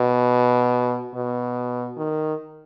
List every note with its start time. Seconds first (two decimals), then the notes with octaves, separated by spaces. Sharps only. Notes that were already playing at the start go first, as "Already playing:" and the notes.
Already playing: B2
1.15 B2
1.97 D#3